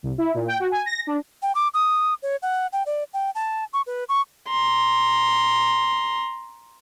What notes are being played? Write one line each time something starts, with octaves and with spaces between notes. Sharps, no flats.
C2
E4
A#2
G5
F#4
G#5
A#6
D4
G5
D6
D#6
C#5
F#5
G5
D5
G5
A5
C#6
B4
C#6
A#5 C6